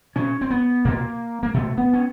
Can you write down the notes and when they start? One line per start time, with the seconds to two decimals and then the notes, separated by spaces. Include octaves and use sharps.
0.16 B2 C#4
0.41 C4
0.50 B3
0.85 B2 A#3
1.43 A#3
1.54 B2 A3
1.78 B3
1.93 C#4